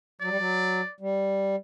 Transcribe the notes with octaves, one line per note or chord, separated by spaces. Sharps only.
F#3 D5
G3
F#3
G3